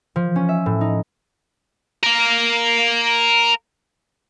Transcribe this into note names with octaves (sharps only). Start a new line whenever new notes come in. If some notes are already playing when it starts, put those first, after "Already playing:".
F3
C#4
E5
A2
D#4
A#4 F5